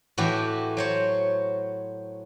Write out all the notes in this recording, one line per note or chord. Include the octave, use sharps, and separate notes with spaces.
A2 E3 F#4 G4
F#3 C5 C#5